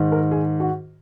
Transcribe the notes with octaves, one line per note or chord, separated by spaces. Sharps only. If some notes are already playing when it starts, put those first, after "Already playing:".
Already playing: G#2 D#3
A#4
G#4
F#4